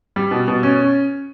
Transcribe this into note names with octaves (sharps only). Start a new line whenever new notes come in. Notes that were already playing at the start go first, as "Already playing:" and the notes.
G3
B2
B2
C#4